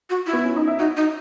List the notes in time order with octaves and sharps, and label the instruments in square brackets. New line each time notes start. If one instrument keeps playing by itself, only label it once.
[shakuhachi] F#4
E4
[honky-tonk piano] B3
C#4
D#4
E4
[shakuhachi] D#4 [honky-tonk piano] F#4
[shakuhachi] D#4